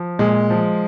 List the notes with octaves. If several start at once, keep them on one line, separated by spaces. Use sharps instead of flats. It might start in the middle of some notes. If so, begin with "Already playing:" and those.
Already playing: F3
A#2 G#3
F3